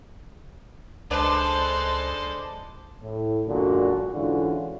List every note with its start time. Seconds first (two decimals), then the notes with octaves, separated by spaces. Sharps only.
1.11 C#2 G#3 D4 A4 B4 C5 D5
3.02 A2
3.48 F#2 A#2 D3 G#3 F#4
4.13 G#2 D3 E3 C#4 F4 F#4